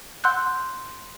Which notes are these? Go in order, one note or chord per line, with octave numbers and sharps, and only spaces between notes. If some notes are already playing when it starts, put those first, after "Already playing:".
F#5 C6 E6 F#6 G6